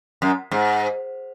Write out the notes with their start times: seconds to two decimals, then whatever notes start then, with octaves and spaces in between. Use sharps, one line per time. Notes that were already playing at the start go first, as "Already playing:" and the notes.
0.22 F#2
0.51 G#2